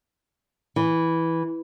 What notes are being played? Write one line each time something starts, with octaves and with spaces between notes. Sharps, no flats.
E3